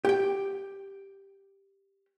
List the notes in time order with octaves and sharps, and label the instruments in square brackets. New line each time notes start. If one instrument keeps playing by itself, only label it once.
[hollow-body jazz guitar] G4 G5